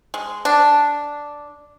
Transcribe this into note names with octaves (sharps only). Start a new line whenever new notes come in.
G#3
D4